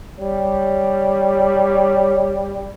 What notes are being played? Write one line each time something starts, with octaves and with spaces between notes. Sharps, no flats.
G3 C#5